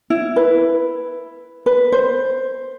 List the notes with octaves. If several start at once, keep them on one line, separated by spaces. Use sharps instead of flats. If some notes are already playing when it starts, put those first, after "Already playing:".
E4
B4
B4
C5